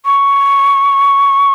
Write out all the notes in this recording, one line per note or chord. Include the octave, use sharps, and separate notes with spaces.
C#6